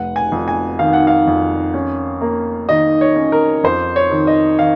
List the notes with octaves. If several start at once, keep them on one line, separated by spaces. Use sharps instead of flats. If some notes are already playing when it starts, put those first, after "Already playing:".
Already playing: F1 F#5
G#5
F2
G#5
D#3 F5
F#5
F5
F2
C#4
A#3
D#3 D#5
C#5
C#4
A#4
F2 C5
C#5
D#3
D#5
D#3 F5